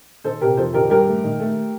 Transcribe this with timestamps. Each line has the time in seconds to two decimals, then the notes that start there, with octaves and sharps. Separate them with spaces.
0.24 D#3 A4 C5
0.41 C3 G4 A#4
0.57 F2 A4 C5
0.73 D#3 G4 A#4
0.90 G2 G4 A#4
1.07 A3
1.24 D#3
1.40 A3